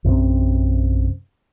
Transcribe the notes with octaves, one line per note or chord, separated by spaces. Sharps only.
A#1 F#2 C3 C4